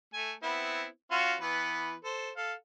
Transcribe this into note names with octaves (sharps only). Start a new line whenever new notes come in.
A3 G#5
B3 C4 E4
C#4 F4 F#4
E3 B3 B4
A4 C5
A4 F5